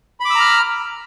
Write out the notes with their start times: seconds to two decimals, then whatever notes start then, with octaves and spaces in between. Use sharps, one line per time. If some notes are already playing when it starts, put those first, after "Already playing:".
0.20 B5
0.25 D6
0.30 E6
0.35 A#5
0.40 F6